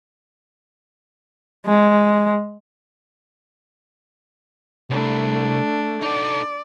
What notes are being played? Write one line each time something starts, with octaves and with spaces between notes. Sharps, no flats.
G#3
C2 A3 D4
D#4 A4 D5